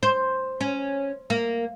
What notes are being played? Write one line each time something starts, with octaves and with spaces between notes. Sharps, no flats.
C5
C#4
A#3